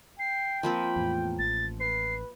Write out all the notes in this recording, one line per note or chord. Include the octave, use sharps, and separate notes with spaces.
G5 C7
F3 A#3 C4 B5
E2 A2
A1 A6
B4 C7